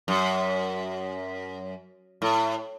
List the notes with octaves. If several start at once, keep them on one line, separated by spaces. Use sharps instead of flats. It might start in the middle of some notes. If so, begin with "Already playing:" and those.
F#2
A2